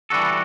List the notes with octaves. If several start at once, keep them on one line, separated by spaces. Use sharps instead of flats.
E3 G3 D4 F#4 A4